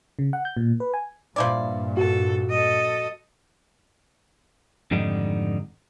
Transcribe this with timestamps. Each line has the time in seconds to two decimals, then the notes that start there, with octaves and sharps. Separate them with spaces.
0.19 C#3
0.33 F#5
0.45 G6
0.57 A#2
0.80 B4
0.94 G#5
1.36 G2 A#2 F3 E4 D5
1.97 F#4 A4
2.50 A4 D#5
4.91 F2 G#2 D3 D#3 G3 D#4